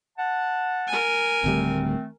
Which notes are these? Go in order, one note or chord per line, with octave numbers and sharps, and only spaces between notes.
F#5 A5
A#4 G#5
D1 D2 D#3 G3 A3 C4